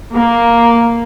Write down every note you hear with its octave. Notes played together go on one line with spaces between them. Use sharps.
A#3